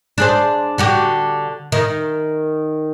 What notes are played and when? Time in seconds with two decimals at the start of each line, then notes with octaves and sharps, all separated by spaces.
0.18 D4 G#4 C5
0.78 D3 F#4 G4
1.72 D#3